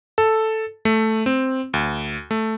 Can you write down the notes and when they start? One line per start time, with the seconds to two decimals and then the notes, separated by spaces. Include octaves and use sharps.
0.18 A4
0.85 A3
1.26 C4
1.74 D2
2.31 A3